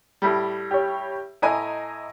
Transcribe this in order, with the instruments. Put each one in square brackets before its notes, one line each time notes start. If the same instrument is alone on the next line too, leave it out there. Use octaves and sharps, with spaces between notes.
[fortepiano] A2 G3
[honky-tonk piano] G4 C#5
[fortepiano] A2 G#5 [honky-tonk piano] D#5 A#5